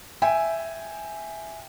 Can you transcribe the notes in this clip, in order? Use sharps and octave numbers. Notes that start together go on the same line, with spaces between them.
E5 G5 G#5